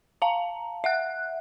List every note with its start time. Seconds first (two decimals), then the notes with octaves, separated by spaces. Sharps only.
0.22 F5 A5 A#5
0.84 E5 F#5 F#6